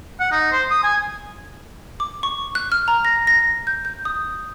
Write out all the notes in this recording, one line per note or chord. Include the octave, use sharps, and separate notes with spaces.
F#5
D#4
C5
D#6
G#5
D6
C#6
F#6
F6
A#5
A#6
A#6
G6
G6
D#6